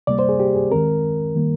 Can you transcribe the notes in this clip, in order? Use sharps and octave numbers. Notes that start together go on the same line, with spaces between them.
D2 C3 G3 A#3 D5
C5
G#4
G4
G#4
D#2 D#3 G#3 C4 A#4
D#3 G3 A#3